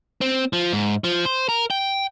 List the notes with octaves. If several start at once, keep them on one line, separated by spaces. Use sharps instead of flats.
C4
F3
G#2
F3
C5
A#4
G5